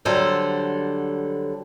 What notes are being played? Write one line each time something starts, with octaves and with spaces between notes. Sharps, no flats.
D3 F#3 G3 A4 C5